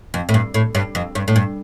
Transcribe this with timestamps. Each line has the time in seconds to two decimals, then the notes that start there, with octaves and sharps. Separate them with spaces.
0.14 F2
0.29 A2
0.34 G2
0.54 A2
0.75 G2
0.95 F2
1.15 G2
1.28 A2
1.36 G2